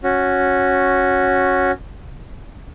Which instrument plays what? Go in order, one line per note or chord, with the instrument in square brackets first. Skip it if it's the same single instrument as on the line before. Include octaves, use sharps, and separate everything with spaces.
[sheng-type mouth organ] C#4 F#4